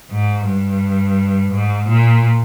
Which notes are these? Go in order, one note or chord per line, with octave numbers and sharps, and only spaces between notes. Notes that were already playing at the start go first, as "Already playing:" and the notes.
G#2
G2
G#2
A#2